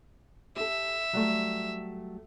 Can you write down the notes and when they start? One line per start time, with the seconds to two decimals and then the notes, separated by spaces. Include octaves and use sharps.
0.56 G4 A4 E5
1.13 F#3 G3 A3